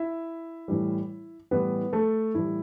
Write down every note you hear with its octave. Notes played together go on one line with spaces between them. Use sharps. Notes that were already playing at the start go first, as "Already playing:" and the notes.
Already playing: E4 E5
A2 E3 G3
A2 E3 G3 B3 B4
A3 A4
A2 E3 G3 E4